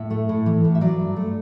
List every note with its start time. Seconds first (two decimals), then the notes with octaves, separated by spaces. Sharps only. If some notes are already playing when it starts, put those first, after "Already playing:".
Already playing: A2 E5
0.11 A3
0.29 A2
0.46 E3
0.64 A2
0.75 E5
0.81 F#3 D5
0.99 G2
1.16 A3